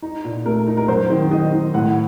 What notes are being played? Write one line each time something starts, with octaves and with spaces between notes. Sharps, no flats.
D#4
A#2
A3 A#4
D#4
A#4
F#2 C5
D#3
D#3 D#5
D#3
A2 F#5